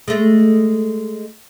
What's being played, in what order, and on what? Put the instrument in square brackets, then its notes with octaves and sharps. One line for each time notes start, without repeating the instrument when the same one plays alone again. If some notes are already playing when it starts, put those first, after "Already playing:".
[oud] G#3 A3